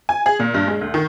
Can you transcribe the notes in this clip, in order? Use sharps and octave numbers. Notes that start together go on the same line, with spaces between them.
G#5
G#4
A#2
G2
G#3
D2
D#3